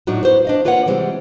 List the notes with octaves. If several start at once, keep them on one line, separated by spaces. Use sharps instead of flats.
A2 F#3 D4 D#4 F4 F#4
B3 F#4 C5
D4 D#5 F5
A#3 F4 B4 C#5 D#5 F#5
C3 E3 G3 G#3 C4